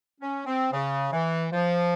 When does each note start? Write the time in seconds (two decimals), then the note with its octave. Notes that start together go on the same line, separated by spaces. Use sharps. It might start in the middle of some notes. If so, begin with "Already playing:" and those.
0.20 C#4
0.46 C4
0.72 C#3
1.12 E3
1.52 F3